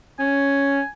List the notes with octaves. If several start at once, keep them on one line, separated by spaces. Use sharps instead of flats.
C#4 G#5